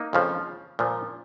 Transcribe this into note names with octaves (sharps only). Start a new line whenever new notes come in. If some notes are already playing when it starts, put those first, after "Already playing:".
Already playing: A#3 D#4
F2 C#3 F3
A#2 F3